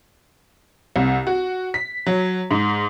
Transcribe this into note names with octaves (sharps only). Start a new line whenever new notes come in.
C2
F#4
B6
F#3
G#2